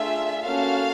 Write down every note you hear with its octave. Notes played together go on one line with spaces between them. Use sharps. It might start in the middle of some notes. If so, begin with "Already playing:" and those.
Already playing: A3 D4 F4 G#4 E5
A#3 C#4 F#4 A4 F5